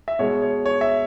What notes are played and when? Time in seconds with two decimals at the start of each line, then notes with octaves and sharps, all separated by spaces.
0.08 E5
0.19 B2 G#3 C#5
0.42 C#5
0.66 C#5
0.81 E5